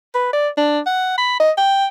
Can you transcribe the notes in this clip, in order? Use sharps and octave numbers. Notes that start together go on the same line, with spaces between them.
B4
D5
D4
F#5
B5
D#5
G5